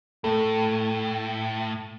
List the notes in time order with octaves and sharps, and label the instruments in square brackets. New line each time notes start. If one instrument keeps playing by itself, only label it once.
[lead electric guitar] A2 [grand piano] A3